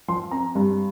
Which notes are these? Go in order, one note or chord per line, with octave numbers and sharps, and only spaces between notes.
F3 C6
C4 A#5
G2